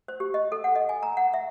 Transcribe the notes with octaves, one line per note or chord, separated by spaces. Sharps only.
C5
G4
D#5
A4
F#5
D#5
G#5
A#5
F#5
E5